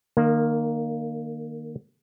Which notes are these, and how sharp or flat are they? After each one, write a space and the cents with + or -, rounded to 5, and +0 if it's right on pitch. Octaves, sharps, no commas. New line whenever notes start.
D#3 -30 A#3 +0